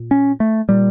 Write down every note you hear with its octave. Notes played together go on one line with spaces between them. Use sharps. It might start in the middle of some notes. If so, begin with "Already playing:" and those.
Already playing: A#2
C#4
A3
A#2 G3